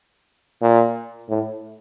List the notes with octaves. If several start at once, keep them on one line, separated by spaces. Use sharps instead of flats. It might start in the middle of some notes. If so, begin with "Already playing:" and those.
A#2
A2